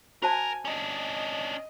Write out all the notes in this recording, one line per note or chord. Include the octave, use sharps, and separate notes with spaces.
F#4 A#4 C5 G#5 A5
C#4 D4 D#5